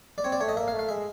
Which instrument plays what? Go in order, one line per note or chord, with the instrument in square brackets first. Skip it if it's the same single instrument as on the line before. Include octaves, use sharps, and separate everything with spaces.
[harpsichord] D5
[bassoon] C4 [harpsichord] C#5
[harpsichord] D5
[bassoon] A3 [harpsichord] C#5
[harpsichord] D#5
[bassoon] A#3 [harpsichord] E5
[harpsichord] F5
[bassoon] A3
[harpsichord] F5
[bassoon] G#3 [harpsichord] E5